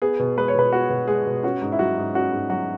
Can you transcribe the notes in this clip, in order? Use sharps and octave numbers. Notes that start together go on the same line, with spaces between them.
B3 G#4
B2
G#3 B4
C#5
B2 B4
B3 F#4
B2
G#3 G#4
B2
C#4 F#4
G#2
E4
F#3 F#4
G#2
C#4 F#4
G#2
F#3 F#4